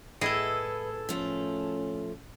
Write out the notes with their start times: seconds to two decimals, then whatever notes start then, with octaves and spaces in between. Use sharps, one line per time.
0.21 A2 E4 G#4 A4 B4 D#5
1.09 F3 A3 C#4